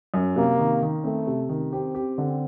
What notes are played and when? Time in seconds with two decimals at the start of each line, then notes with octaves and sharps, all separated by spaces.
0.14 F#2
0.36 C3 A#3
0.59 D#3
0.82 D#3
1.04 A3 C4
1.27 C3
1.49 D#3
1.72 C4 G4
1.95 G4
2.18 D3